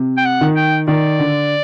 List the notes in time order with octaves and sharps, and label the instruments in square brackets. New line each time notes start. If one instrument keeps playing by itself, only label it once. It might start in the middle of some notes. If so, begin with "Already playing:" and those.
Already playing: [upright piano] C3
[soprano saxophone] G5
F#5
[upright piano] D#3
[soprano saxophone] G5
[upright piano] D#3 [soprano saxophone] D5
[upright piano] D3